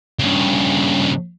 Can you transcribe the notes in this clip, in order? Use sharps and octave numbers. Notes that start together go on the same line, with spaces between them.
G2 C#3